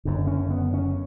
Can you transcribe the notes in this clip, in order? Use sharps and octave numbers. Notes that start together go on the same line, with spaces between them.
F#1 F#2 D3
C#4
B3
C#4